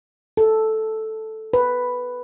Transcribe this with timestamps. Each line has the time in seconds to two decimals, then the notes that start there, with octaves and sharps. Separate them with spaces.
0.37 A4
1.53 B4